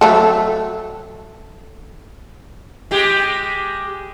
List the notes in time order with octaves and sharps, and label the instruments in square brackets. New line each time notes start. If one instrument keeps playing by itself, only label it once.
[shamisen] F#3 A3 A4
[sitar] G#3 G4